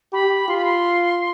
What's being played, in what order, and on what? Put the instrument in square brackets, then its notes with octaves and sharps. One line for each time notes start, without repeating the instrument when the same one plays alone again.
[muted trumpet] G4 [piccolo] B5
[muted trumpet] F4 [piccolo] C6
[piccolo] B5
C6